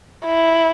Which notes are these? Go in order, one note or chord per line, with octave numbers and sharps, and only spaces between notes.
E4